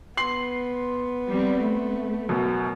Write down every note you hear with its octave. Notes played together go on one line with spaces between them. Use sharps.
B3 C6 C7 F#7
G3 C4
A3
F#2 B2